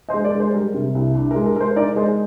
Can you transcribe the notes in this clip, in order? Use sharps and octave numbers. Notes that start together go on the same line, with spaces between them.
C5 D#5
G#3
A#4 D5
G#3
C5
G3 A#4
C3
C2
D4
A#4
G#3
A#4
G#3 A#4 C5
D#4 A#4 D5
G#3 C5 D#5